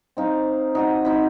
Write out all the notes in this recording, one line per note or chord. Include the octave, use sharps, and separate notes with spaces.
C4 D#4 F5
D#4 F#4 D#5
C4 D#4 C5 B5